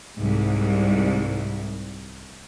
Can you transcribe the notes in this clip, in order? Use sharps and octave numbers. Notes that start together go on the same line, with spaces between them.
C2 G#2